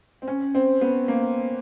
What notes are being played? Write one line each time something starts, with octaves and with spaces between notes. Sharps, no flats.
C4
C#4
C4
B3
A#3